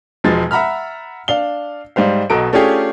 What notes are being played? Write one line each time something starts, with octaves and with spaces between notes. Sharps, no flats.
E1 F3 G#3 A6
E5 F#5 A#5 B5 F6
D4 F5 G7
G#2 G3 C5 F5
B1 B2 A4 A#5 D7
A3 C#4 D4 F4 G4 G#4